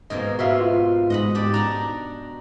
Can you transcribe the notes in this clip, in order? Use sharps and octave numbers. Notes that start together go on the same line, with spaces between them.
G#2 B2 A#3 D#5
B2 F#4 B4 E5 F5 C6
F4
G#2 D#5 F#5 B5
D4 G4 D5
D4 D#4 F#4 A#5